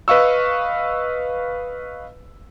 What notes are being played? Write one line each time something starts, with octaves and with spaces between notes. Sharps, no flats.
B4 D#5 F5 C#6 E6